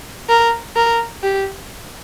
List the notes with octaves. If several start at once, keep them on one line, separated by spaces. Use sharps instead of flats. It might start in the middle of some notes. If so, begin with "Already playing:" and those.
A#4
A#4
G4